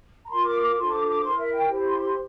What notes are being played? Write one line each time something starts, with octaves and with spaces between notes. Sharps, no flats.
A#5
F4 A#4 C6
D6
D6
D4 F4 A4 C5 C6
D6
D6
E4 A#4 C6
E5
G5
E4 G4 C5
C6
C6